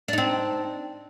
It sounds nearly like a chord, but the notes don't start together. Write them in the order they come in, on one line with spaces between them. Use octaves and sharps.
D4 D#4 C4